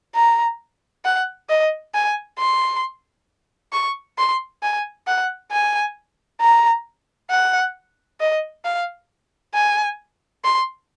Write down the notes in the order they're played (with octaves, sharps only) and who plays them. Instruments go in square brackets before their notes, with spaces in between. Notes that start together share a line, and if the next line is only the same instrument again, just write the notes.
[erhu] A#5
F#5
D#5
G#5
C6
C#6
C6
G#5
F#5
G#5
A#5
F#5
D#5
F5
G#5
C6